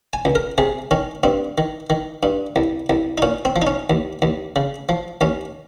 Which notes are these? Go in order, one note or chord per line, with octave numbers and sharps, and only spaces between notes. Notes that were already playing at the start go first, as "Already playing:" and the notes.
G#5
C#2
A#4
C3 G#4
D#3 C#4
G2 C4
D#3
D#3
G2
C2
C2
D#4
A#2 C#4
C4
F3
D#4
C#4
D#2
D#2
C#3
F3
D#2 C#4